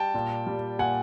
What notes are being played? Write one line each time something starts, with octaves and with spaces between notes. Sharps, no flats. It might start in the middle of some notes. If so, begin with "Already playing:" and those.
Already playing: G3 G5 A5
A#2
G3
A#2 F#5 G#5